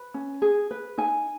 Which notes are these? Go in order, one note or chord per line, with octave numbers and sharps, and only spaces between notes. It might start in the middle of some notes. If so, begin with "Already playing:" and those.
Already playing: B4
C#4
G#4
B4
D#4 G#5